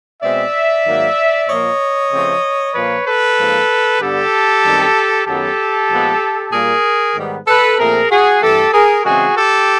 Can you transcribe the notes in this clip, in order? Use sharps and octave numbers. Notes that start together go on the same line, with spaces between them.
B2 G#3 C4 D5 E5
G#2 D#3 F#3 A#3
A#2 F3 A#3 C#5 D#5
C#3 F3 A3 C4
A#2 F3 A#3 B4 C#5
A4 B4
G#2 F3 A#3
G2 D3 G3 B3 G4 A4
F#2 D#3 G3 C4
F#2 D#3 F#3 B3 G4 A4
A#2 F3 G#3 B3
A#2 G3 A#3 G#4 A#4
G#2 D#3 G3 B3
A4 B4
A#2 F3 A3 C4 G#4 A#4
F#4 G#4
G2 E3 A3 G4 A4
G#4 A#4
C#3 E3 G#3 C4 F#4 G#4
G4 A4